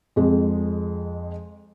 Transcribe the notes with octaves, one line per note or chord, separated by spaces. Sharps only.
F2 G#3